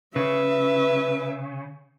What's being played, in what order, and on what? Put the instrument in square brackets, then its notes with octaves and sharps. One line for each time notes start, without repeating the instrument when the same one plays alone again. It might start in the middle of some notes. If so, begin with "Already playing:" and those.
[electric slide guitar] C#3 [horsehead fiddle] C#4 E5 [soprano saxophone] B4